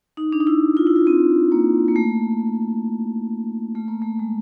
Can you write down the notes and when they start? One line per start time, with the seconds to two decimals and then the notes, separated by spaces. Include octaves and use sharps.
0.17 D#4
0.32 D4
0.40 D#4
0.47 E4
0.77 F4
0.87 E4
0.96 F4
1.07 C4
1.52 A#3
1.88 A#3
1.96 A3
3.75 A3
3.88 A#3
4.02 A3
4.19 G#3